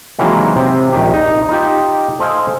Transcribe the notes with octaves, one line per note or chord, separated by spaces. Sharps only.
C3 D#3 E3 F#3 G#3 A#3
C3 C4
A#1 D#2 D#3 G4
D#4
D#4 F4 G4
A4 C5 D#5 F5 G#5